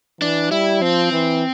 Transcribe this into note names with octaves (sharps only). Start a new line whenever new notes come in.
E3 D4
G3 E4
F3 C4
E3